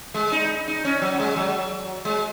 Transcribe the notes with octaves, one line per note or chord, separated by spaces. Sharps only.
G#3
D#4
D#4
C#4
F#3
G#3
F#3
G#3